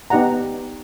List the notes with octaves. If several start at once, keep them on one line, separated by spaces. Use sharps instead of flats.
B3 D#4 G4 D5 F#5 A#5